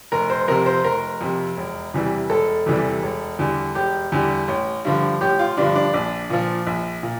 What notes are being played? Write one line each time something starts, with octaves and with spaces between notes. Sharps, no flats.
F1 A#4
C5
F2 C3 A#4
C5
F1 A#4
F2 C3
E1
E2 C3 E3 G3
E1 A4
E2 C3 E3 G3
E1
E2 D3 G3
E1 G4
E2 D3 G3
A1
G2 D3 F3
A1 G4
F4
G2 D3 F3 D4
D4
A#1 D4
A#2 F3
A#1
A#2